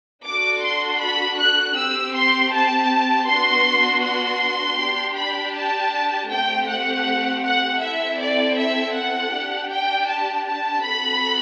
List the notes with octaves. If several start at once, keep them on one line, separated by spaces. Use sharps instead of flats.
D4 F#4 A4 D6
C6
B5
F#6
C4 G4 E6
C6
A5
B3 D4 F#4 C6
C6
D4 G4
B5
A5
A3 C4 G4 G5
F#5
F#5
C4 E4 A4 E5
D5
E5
F#5
D4 G4
G5
A5
A5
C4 F#4 A4 B5